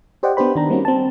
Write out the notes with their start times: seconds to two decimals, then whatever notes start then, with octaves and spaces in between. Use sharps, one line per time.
0.23 G4 C5 D5 D#5 F#5 G5
0.37 B3 D4 G4 C5 B5
0.55 D#3 D4 A#5
0.70 G3 A#3 C4 C#4 D#4 F#4
0.85 C4 A5